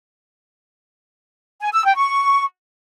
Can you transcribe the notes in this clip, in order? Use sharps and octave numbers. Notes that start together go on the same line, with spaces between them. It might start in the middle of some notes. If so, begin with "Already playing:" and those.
G#5
E6
G5
C#6